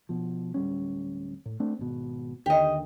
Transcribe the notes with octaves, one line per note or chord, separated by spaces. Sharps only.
B2 F3
D1 G3 C#4
A2
A3 C4 D4
G#1 B2
D#2 D3 D#3 G4 D#5